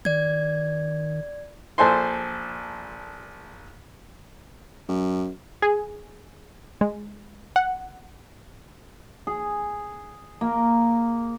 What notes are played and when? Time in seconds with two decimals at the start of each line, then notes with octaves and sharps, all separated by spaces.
0.05 D#3 D5 G#6
1.78 A#1 A4 C5 G#5 C6
4.89 F#2
5.62 G#4
6.81 G#3
7.56 F#5
9.27 G#4
10.41 A#3